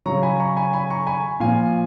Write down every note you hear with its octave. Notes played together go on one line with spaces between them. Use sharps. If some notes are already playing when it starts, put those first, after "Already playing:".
C#3 F#3 A#5 C#6
G#5 B5
A#5 C#6
G#5 B5
G#5 B5
A#5 C#6
G#5 B5
A#2 F3 F5 G#5